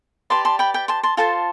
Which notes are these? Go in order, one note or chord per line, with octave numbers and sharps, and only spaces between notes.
G4 B4 D5 A5 C6
A5 C6
G5 B5
G5 B5
A5 C6
A5 C6
F4 A4 C5 A5 C6